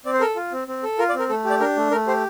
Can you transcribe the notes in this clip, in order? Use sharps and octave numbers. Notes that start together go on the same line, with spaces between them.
C4 D5
C5
A4 A#4
F4
C4
C4
A4
F4 A#4
D5
C4
A#4
A3 A4
G4
D5
D4 A#4
A3
A3 A#4
G4 C5